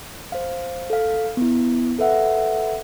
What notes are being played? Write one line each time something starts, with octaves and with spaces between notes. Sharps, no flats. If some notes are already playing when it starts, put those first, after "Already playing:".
C5 F5
A4 F5
B3 E4
A4 B4 E5 F#5